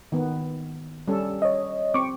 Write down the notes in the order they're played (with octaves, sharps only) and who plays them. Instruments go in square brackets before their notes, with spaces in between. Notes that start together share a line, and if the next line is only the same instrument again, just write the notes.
[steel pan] D#3 B3
G3 C#4 A4
[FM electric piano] C#5 D#5
[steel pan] C4 [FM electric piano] C#6 D6